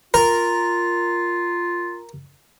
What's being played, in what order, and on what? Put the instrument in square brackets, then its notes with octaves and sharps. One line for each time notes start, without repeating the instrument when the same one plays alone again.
[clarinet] F4 [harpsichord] A#4